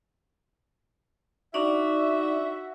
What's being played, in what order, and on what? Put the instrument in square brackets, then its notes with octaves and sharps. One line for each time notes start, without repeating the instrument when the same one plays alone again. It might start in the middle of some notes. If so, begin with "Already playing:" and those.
[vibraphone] D4 D#4 D5 [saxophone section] F#4 E5